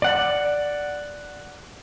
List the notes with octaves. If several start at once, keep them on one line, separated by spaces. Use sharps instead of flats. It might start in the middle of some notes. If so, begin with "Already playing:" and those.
D5 F#5